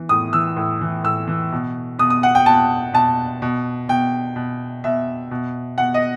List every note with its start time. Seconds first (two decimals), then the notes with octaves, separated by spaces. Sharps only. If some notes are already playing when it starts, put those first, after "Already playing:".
Already playing: E3
0.09 A2 D#6
0.33 E3 E6
0.56 A2
0.81 E3
1.04 A2 E6
1.28 E3
1.52 B2
1.99 B2 D#6
2.10 D#6
2.23 F#5
2.35 G5
2.46 B2 A5
2.94 B2 A5
3.42 B2
3.89 B2 G5
4.36 B2
4.84 B2 E5
5.31 B2
5.78 B2 F#5
5.94 D#5